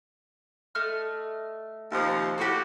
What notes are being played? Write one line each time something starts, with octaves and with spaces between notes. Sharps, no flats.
A3 D#5 F6
D#2 C3 F3
A2 F#4 G4 A4